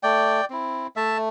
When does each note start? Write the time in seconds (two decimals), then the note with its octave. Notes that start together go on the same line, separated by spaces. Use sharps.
0.03 A3 D5 G5
0.50 C4 E4
0.96 A3 E5 A5